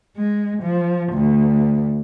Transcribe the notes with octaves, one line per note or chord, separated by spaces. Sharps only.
G#3
F3
D2